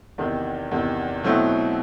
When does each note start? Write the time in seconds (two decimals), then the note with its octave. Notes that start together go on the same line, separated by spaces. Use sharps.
0.18 E2 C3 D#3
0.71 E2 C3 D#3
1.23 B2 F#3 A3 C4 E4